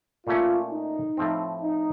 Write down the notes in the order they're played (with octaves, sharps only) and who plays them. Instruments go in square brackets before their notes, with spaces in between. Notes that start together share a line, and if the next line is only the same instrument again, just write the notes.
[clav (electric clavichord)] A#2 A3 C#4 [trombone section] F4
[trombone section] D#4
[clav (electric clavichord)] A2 F3 C4
[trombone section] D#4